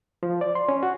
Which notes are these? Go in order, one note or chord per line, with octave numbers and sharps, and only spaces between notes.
F3
D5
C6
C#4
F#4